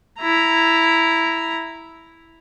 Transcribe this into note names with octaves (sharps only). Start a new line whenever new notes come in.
E4 A#5